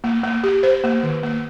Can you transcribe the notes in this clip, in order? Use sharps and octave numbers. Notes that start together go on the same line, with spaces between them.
A#3
A#3
G4
C5
A#3
D#3
A#3